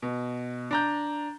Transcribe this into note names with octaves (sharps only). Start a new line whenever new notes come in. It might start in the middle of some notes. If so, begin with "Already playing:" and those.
B2
D4 A#5 G6